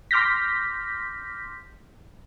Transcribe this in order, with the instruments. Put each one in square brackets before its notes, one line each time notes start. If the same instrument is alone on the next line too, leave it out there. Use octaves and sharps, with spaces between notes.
[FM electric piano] C6 D6 F6 G6 A#6 B6